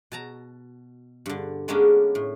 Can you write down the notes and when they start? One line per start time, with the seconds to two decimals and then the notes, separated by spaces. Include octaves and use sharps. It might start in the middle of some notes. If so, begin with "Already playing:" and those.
0.12 B2 A5 A#5
1.26 G2 D3
1.68 D3 G#3 A#3 B3 C#4 D4
2.15 A2